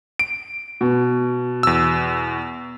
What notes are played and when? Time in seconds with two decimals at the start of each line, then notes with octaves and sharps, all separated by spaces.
0.19 D7
0.81 B2
1.63 E2 E6